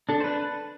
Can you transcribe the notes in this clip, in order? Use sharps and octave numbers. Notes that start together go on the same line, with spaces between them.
D4 A4
C5
D4 B4